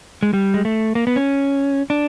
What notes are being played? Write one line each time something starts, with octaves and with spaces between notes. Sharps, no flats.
G#3
G3
G#3
A3
A#3
B3
C#4
D4